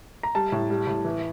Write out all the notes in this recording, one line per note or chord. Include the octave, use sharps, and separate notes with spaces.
A#5
G3 A5
A2
G3
A2
E3